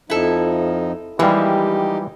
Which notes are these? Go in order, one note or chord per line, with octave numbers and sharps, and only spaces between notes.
F2 F3 D#4 E4 A4
E3 F3 G3 G#3 A#3 D#4 G4